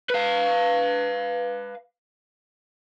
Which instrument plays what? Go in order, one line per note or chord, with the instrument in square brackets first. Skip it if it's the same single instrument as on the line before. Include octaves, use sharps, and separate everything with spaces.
[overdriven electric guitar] B4 F5